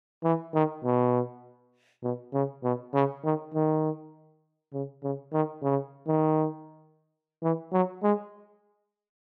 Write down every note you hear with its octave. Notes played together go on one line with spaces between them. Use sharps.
E3
D#3
B2
B2
C#3
B2
C#3
D#3
D#3
C#3
C#3
D#3
C#3
D#3
E3
F#3
G#3